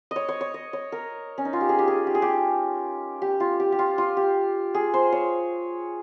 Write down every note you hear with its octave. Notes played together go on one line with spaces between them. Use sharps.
C#5 D#5
C#5
C#5
D#5
C#5
A#4
C#4
D#4
F4
G4
G#4
G4
G#4
G4
G#4
G4
G4
F4
G4
G4
F4
F4
G4
G#4
C5
C#5